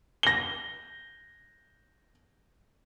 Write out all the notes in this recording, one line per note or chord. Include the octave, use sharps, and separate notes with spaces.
A#6 G7